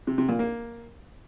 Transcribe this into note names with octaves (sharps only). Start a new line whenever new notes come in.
C3
C3
A#2
A#3